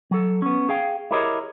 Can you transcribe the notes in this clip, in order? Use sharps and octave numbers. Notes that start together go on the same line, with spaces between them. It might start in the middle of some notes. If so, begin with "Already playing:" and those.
F#3 A4
B3 C#4
G#4 F5 G5
E4 G4 G#4 A#4 C#5 D#5